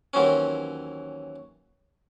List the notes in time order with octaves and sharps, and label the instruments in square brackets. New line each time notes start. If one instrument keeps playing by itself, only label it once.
[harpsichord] D#2 E3 F#3 C4 C#4